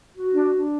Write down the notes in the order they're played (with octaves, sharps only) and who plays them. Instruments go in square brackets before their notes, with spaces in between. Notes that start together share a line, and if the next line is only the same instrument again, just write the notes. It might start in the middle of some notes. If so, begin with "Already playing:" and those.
[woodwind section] F#4
D4
D4